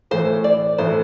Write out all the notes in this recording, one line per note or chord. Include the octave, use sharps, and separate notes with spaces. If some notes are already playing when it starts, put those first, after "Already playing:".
A2 E3 A3 C5
D5
A2 E3 A3 C5